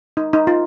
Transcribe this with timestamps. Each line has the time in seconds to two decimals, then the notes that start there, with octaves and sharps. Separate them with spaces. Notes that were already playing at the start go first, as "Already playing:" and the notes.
0.17 D#4
0.33 D#4
0.47 F4